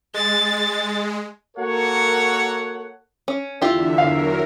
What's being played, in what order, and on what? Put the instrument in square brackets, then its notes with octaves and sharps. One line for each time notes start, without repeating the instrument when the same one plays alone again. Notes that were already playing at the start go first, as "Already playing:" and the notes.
[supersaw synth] G#3 [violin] A6
[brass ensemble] A#3 F#4 A4 A#4 C#5 F#5
[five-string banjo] C#4
[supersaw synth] E2 D3 E5 [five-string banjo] E4 F4 G4
[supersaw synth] F#3 A#4 [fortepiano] F5